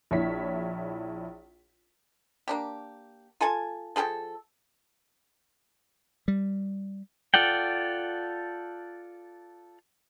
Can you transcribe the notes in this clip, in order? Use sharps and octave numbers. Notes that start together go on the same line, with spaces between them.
A#1 E4 C#5 B6
A#3 D4 G4
F4 A4 G#5 A5
F3 G#4 A4 G5
G3
F4 A4 D5 F#5 G5